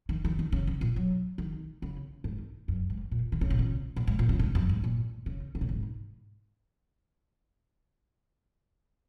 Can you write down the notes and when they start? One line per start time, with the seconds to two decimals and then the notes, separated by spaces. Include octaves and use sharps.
0.09 D#3
0.25 D#3
0.39 D#3
0.52 C#3
0.67 C#3
0.81 A#2
0.96 F#3
1.38 D#3
1.82 C#3
2.24 G#2
2.68 F#2
2.90 G#2
3.11 A#2
3.32 D#3
3.41 C#3
3.50 A#2
3.59 C#3
3.96 A#2
4.07 G#2
4.19 A#2
4.29 C#3
4.39 G#2
4.55 F#2
4.69 G#2
4.84 A#2
5.26 C#3
5.55 C#3
5.61 A#2
5.69 G#2